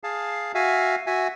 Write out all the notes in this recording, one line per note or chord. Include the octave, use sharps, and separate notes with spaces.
G#4 F5 A5
F#4 E5 F5 G#5
F#4 E5 G#5